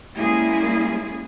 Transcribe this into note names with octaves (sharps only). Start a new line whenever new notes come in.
G3 G#3 A#3 C#4 E4 G#4